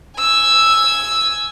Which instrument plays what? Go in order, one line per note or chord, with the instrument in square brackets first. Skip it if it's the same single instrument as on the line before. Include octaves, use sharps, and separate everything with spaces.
[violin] G#5 E6